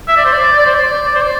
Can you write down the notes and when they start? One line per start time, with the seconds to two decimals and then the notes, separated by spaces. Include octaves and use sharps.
0.08 E5
0.17 D5
0.25 C5
0.33 D5
0.58 D5
0.66 C5
0.74 D5
1.07 D5
1.15 C5
1.22 D5